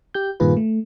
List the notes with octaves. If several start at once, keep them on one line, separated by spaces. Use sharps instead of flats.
G4 G6
G2 A#2 D#3 F4 G#4 B4
A3